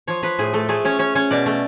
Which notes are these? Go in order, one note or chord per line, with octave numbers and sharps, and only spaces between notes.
F3 C#5
F3 B4
A2 G#4
A3 A4
A3 G#4
C#4 C#5
C#4 C#5
C#4 C#5
B2 D5
A3